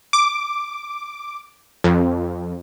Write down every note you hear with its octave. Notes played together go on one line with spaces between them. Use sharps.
D6
F2